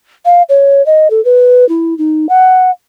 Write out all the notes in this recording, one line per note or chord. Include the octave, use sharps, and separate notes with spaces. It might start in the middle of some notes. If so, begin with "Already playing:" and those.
F5
C#5
D#5
A4
B4
E4
D#4
F#5